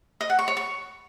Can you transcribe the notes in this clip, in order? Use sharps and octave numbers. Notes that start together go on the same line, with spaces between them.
D#5
F#5
C#6
C#5
C#6